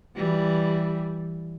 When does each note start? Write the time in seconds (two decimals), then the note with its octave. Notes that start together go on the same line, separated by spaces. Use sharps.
0.16 E3 G3